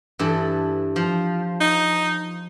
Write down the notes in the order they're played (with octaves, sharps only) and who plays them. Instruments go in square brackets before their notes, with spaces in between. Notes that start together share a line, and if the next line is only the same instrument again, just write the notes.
[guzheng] G2 E3 A4
F3
[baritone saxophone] D#4